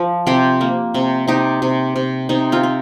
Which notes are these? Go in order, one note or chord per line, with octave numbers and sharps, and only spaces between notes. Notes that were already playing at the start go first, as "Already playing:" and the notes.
Already playing: F3
C3 G4 C5
A#3
C3
C3 D#4 G4
C3
C3
C3 D#4
C4 F4
C4